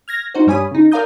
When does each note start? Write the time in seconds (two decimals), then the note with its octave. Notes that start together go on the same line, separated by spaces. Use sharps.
0.08 F6 G#6 A#6
0.34 D#4 F#4 C5
0.47 G2 G3 C#5 G#5 B5 D#6
0.71 C#3 D#4
0.92 A#4 D5 F5 A#5 D#6 G6